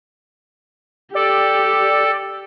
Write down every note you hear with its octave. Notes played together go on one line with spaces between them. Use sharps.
G4 A4 D5